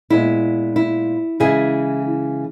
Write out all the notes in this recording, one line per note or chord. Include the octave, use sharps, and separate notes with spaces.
A#2 G#3 B3 E4
E4
C#3 E3 G#3 E4 G#4